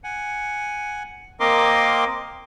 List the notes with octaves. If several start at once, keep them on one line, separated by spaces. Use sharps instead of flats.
F#5 G#5
A#3 C4 A#4 D#5 C6 D6